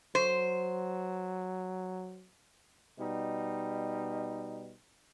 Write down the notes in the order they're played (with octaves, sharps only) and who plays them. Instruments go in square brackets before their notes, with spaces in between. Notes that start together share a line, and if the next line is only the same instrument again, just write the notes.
[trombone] F#3 [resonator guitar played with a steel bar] C5
[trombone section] B2 G3 D#4